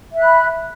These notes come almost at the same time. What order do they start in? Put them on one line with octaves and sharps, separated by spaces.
E5 F#6 B5